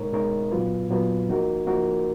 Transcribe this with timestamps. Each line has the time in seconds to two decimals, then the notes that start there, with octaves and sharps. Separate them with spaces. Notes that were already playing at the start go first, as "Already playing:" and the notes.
Already playing: B2 G#3 D#4 A#4 C#5
0.12 B2 G#3 D#4 A#4 C#5
0.51 A#2 F#3 B3 F4 B4
0.89 A#2 F#3 B3 F4 B4
1.28 F3 A#3 D#4 F#4 A#4
1.66 F3 A#3 D#4 F#4 A#4